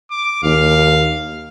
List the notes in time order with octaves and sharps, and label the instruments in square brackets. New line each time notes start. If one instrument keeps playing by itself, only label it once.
[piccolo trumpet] D6
[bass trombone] D#2 [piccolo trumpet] F5